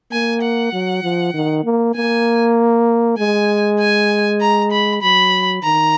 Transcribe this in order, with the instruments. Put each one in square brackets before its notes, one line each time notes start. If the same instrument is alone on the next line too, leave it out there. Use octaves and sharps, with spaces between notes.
[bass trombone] A#3 [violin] G#5
[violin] F#5
[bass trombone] F#3
F3
D#3
A#3
[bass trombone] A#3 [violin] G#5
[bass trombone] G#3 [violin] G#5
[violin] G#5
A#5
B5
[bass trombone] F#3 [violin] B5
[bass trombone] D#3 [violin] A#5